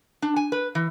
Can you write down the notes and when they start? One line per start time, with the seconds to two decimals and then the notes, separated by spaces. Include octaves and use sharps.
0.22 D4
0.36 G#5
0.52 B4
0.75 E3